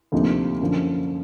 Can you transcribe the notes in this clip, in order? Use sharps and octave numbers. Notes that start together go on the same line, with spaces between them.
D2 C3 F3 A#3 D#4
F#2 D3 F3